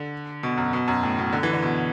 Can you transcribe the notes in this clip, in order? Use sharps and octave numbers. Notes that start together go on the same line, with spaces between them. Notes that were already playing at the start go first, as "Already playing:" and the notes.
Already playing: D3
B2
F#2
B2
F#2
A2
B2
D3
E3
D3
B2